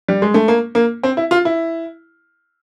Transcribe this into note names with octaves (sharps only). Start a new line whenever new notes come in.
G3
G#3
A3
A#3
A#3
C4
E4
F4
E4